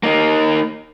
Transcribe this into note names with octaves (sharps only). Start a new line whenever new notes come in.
A#3 D#4